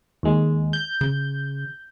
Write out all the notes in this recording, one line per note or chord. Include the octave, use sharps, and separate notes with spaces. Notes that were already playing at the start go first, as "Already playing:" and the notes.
D#2 G#3
G6
C#3